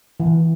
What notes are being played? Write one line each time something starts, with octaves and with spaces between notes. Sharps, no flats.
E3